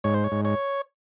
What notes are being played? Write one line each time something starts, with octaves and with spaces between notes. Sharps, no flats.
G#2 C#5
C5
C#5
G#2
C#5